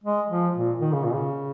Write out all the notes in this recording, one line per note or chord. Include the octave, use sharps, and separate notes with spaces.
G#3
F3
A#2
D#3
C#3
A#2
C#3